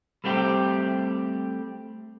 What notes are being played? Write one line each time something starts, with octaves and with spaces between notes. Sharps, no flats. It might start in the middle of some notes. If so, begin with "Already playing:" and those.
G3 A3 C4 F4 G4